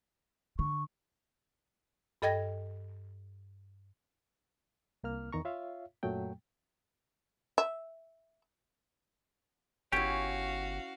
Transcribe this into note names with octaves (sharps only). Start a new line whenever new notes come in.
D3 C#6
G2 A4 D#5 G5 G#6 A#6
C2 A#3 F6
E2 D#3 A#5 C#6
F4 C#5 E5 F5
F#2 A#2 F#3 A3 G5
E5
G1 C#4 E4 F#4 G4 F5